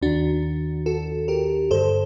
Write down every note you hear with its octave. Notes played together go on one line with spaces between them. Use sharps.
D#2 D#3 D4 F#4
F#4 A4
G4 A#4
G2 D3 A4 C5